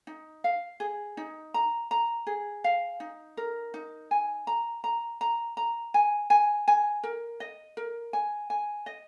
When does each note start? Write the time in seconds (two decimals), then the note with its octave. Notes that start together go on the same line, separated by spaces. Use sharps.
0.07 D#4
0.44 F5
0.80 G#4
1.17 D#4
1.54 A#5
1.91 A#5
2.27 G#4
2.64 F5
3.00 D#4
3.37 A#4
3.74 D#4
4.11 G#5
4.47 A#5
4.84 A#5
5.21 A#5
5.57 A#5
5.94 G#5
6.30 G#5
6.68 G#5
7.03 A#4
7.40 D#5
7.77 A#4
8.13 G#5
8.50 G#5
8.86 D#5